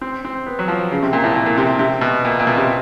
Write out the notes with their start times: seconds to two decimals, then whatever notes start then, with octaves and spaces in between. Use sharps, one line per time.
0.02 C4
0.25 C4
0.46 B3
0.59 F#3
0.68 F3
0.91 C#3
1.03 C3
1.13 A#2
1.24 A2
1.36 A#2
1.46 A#2
1.57 C3
1.79 C3
2.01 B2
2.25 A#2
2.40 A#2
2.47 B2
2.57 C3